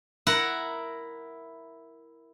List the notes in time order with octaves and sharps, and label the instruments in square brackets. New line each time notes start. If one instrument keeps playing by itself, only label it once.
[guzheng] E4 A#4 F#5